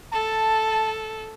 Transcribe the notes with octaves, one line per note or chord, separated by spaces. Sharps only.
A4 A5